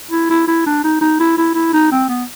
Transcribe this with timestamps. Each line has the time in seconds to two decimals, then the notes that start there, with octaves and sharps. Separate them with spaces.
0.11 E4
0.30 E4
0.48 E4
0.66 D4
0.84 D#4
1.01 D#4
1.20 E4
1.38 E4
1.55 E4
1.73 D#4
1.92 C4
2.09 B3